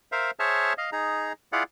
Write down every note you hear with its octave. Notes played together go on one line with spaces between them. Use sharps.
A#4 C5 E5 F5
G#4 C5 C#5 E5 A5 F6
D#5 F5
D#4 G#4 A#5
E4 F4 G#4 D5 F5 F#5